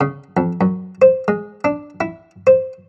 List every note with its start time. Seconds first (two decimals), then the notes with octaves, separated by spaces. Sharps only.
0.01 C#3
0.37 F2
0.61 F#2
1.02 C5
1.28 G#3
1.64 D4
2.01 E4
2.47 C5